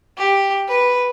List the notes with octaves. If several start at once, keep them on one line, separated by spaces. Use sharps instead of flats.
G4
B4